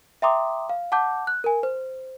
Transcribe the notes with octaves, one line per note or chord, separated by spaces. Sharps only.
E5 G5 A#5 C6 D6 D#6
F5
F#5 A5 D6 G6
F#6
A#4 G#5
C5